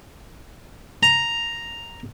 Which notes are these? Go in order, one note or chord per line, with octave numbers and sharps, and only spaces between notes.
A#5